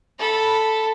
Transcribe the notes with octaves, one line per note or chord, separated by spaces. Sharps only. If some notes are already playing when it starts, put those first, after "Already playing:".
A4 B5